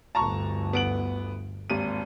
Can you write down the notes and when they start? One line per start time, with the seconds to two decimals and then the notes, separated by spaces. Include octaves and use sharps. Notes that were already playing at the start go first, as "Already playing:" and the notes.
0.15 G1 D2 A5 A#5 C#6
0.73 B3 D7 F#7
1.70 G#1 D#2 D#7